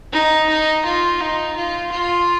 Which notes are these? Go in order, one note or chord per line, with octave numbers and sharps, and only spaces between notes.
D#4
D#4
F4
D#4
F4
F4